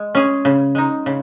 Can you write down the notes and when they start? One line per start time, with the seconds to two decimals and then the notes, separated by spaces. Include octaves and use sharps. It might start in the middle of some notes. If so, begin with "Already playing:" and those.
Already playing: G#3
0.15 C#4 G#4
0.45 C#3
0.75 G#3 D#4
1.06 C#3